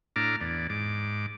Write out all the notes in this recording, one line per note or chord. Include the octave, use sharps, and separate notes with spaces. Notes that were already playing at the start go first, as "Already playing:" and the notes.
A2 D4 A#5 D6 F6
E2 D5
G#2 D6